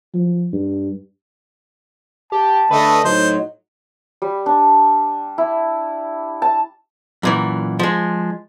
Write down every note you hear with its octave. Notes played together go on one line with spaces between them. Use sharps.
F3
G2
G4 A5
D3 A3 B4 D#5
A2 F#3 D#4 C5 D#5
G3
D4
E4
A5
F#2 A#2 E3
F3 G#3